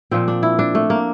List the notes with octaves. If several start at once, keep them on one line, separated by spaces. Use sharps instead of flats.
A#2 F3 C4
D4
E4
D4
A3
A#3